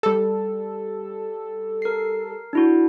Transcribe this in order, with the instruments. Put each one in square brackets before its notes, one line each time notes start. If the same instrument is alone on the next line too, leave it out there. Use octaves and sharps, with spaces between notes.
[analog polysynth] G3 A4
[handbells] A#4 C7
D4 E4 F#4